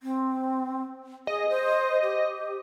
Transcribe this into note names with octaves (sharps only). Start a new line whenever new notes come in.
C4
G#4 D#5
C5
G4